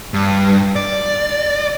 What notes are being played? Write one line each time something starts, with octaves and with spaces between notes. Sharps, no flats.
G2
D5